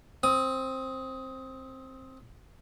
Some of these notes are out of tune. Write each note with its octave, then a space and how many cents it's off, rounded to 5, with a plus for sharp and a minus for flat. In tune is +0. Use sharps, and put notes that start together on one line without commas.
C4 +10 D#6 +20